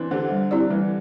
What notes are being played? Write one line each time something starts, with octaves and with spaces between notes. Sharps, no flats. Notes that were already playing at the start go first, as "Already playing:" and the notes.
Already playing: E3 C4 D4
D3 G4 C5
G3
C4 E4 G4 D5
E3 G3